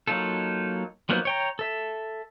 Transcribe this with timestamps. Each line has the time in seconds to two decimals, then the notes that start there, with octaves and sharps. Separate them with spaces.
0.07 F#3 A#3 D#4 F4 A4
1.09 F3 F#3 A#3 B3 D#4
1.25 C#5 G5 A#5
1.59 A4 E5